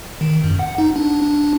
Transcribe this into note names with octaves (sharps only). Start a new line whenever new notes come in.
D#3
F#2
F#5
D#4
D4
D4